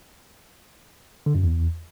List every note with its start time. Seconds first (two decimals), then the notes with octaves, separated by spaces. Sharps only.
1.26 D3
1.35 F#2
1.43 E2